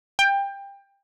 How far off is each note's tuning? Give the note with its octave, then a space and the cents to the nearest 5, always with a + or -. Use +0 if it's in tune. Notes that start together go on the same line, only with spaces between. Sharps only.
G5 +20